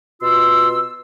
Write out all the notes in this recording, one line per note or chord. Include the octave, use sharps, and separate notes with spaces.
B2 F4 C6 E6